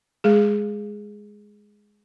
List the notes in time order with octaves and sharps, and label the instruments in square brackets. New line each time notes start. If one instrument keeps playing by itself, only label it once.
[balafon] G#3 G#4